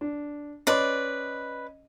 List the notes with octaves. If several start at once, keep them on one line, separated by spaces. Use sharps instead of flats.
D4
C#4 B4 D5 D#5 C6